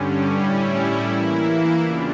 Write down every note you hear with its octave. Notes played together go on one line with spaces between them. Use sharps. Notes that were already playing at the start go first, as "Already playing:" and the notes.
Already playing: G2 D3 G3 C#4
A2 G3 C#4 E4
E3 A#3 E4
E2 C#3 G3 D4 F4